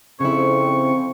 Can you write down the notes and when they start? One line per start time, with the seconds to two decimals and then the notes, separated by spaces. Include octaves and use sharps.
0.20 F2 C#3 C4 E4 C#6